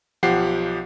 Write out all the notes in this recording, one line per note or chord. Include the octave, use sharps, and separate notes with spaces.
B1 F3 G4 F#5 C7